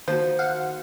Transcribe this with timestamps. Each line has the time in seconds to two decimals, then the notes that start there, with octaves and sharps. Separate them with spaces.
0.08 D#3 F3 A#3 F#4 C5
0.39 F5 F#5